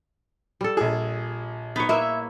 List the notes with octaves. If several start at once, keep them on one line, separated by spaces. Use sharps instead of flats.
G3 A4
A#1 G#4
B3 D#4 C#5
A#3 E4 B4 E5